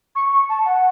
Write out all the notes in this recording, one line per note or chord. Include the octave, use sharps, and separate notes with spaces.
C#6
C#6
A5
F#5